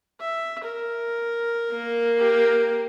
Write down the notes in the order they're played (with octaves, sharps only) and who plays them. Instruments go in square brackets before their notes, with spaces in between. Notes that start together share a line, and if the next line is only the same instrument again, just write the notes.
[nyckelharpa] E5
A#4
[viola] A#3
[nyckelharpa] G4 A#4